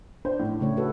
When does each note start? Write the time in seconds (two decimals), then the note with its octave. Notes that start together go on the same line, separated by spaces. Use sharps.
0.25 D4 C5
0.40 A2
0.61 C#3 A3 C#5
0.77 F#4 A4 B4